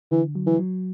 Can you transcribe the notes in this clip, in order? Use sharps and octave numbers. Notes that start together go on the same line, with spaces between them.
D3 E3
F#3
E3
F#3